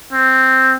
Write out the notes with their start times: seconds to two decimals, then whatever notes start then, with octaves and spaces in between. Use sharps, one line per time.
0.13 C4